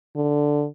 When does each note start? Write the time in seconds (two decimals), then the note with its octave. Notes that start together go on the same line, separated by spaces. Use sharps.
0.16 D3